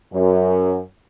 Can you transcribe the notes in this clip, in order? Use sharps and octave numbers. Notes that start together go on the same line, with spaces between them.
F#2